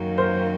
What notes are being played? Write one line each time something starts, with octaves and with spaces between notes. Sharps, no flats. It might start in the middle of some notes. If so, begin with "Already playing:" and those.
Already playing: F#2 D#3 F#3 A#3
A#4 C5